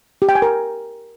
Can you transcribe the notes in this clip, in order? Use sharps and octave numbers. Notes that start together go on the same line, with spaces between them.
G4
G5
G#5
A#4